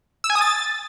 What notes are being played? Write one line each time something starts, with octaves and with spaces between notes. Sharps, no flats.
E6
G#5
D#6
A6